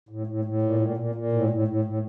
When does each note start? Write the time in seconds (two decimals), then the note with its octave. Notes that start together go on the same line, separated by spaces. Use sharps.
0.09 A2
0.27 A2
0.45 A2
0.62 A#2
0.80 A#2
0.97 A#2
1.15 A#2
1.32 A2
1.50 A2
1.68 A2
1.85 A2